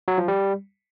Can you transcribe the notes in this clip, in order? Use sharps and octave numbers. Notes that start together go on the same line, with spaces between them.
F#3
F3
G3